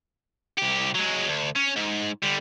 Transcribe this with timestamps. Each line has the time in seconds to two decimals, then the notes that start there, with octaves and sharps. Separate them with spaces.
0.58 C2 G4
0.95 F#3 G#3
1.28 D2
1.56 C#4
1.76 G#2
2.23 D3 G3